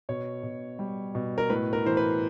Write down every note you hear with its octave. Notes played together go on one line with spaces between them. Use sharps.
B2 C#5
B2
G3
B2
A#4
A2 B4
A#4
E3 C5
B4